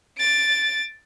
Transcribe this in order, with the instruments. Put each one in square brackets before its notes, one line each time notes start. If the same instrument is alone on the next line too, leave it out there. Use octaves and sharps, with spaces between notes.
[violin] A6 D7